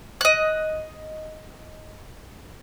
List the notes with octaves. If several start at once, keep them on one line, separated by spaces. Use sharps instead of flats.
D#5 F#6